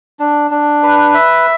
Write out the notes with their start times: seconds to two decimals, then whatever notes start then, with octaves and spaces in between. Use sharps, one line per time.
0.20 D4
0.51 D4
0.83 B4
1.14 E5